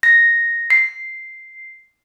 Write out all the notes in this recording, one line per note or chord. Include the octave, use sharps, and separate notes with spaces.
A#6
C7